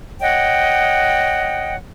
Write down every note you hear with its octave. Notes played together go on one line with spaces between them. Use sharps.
C#5 D#5 F#5 G5